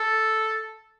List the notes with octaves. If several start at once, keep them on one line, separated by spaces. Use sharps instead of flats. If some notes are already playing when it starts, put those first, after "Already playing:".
Already playing: A4